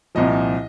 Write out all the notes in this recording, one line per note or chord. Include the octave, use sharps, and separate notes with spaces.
C2 A#2 F3 D#5